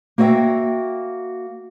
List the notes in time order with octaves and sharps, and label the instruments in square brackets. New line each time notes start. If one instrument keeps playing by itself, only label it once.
[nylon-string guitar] A#3 F#4 C#5 D#5 E5 G5